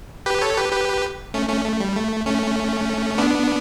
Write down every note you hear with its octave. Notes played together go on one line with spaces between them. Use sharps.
G4 B4
A4 C#5
G4 B4
G4 B4
A3 C#4
A3 C#4
A3
G3
A3
A3 C#4
B3 D4